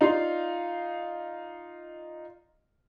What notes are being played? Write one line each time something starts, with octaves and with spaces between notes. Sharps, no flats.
D#4 F4 D5 F5 C6